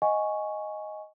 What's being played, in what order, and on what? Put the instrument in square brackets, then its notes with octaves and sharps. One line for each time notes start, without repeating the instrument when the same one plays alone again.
[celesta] D#5 F#5 G#5 C#6